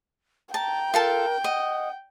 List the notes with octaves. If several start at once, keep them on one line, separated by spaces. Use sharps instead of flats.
G5 A5 A#5
F4 A4 A#4 A5
D#5 F#5